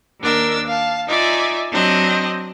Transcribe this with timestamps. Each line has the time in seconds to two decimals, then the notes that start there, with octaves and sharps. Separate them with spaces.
0.21 D#2 D4 A#4 E6
0.66 F5 A5
1.08 D#4 F4 D5 E5 G#5
1.71 F#3 C4 D4 D#5